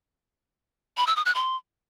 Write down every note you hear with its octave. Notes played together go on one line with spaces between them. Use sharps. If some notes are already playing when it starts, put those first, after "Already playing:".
B5
E6
D#6
F#6
C6